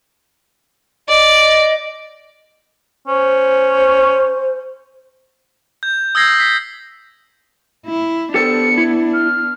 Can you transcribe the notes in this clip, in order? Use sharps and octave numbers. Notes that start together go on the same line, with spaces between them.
D5 D#5
C#4 C5
G6
D#6 E6 G6 G#6 A#6 C7
B6
E4
B3 D4 G4 A4 C5 C#7
E4
F6